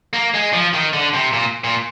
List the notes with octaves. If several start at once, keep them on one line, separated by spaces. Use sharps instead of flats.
A#3
G#3
F3
D#3
D3
C3
A#2
A#2